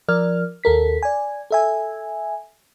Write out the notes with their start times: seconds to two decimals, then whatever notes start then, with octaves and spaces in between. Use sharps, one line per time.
0.09 F3 A#4 D5 F6
0.64 D#2 A4 A#4 B6
1.03 D5 G#5
1.51 A4 E5 G#5